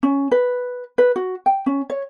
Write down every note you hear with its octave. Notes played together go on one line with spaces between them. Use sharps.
C#4
B4
B4
F#4
G5
C#4
C#5